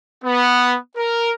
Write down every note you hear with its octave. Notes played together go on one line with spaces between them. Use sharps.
B3
A#4